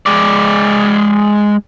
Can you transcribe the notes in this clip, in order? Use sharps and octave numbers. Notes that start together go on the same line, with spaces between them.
G#3 D5